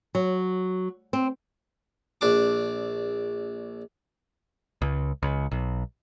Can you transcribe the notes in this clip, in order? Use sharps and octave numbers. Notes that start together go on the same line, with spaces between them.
F#3
C4
A#1 D4 D6
C#2
C#2
B1